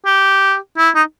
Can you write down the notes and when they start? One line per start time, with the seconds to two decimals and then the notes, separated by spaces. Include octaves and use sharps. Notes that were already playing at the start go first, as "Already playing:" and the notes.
0.05 G4
0.77 E4
0.95 D#4